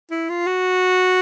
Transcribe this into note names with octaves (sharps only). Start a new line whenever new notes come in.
E4
F4
F#4